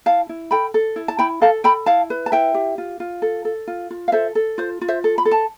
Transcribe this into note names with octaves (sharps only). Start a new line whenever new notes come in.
E4 F5 A5
E4
A4 G5 B5
A4
E4
A5
E4 G5 B5
A4 F5 A5
A4 G5 B5
E4 F5 A5
B4
A5
E4 E5 G5
G4
F4
F4
A4
A4
F4
F4
F5
A4 C5 E5
A4
F4 C5
F4
C5 E5
A4
B5
A4
A5